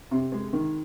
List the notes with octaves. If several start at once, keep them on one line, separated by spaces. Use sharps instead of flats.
C3
G#3
D#3